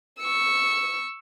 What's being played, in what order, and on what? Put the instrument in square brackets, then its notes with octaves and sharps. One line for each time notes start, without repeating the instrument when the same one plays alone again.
[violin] C#6 E6